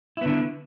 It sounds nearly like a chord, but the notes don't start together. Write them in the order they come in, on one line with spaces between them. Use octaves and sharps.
E4 B3 D3